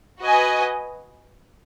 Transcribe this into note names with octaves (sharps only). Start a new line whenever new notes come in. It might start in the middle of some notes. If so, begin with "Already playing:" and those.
F#4 B4 D#5 G#5